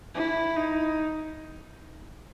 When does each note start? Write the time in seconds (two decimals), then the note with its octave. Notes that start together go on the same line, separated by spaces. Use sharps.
0.15 E4
0.56 D#4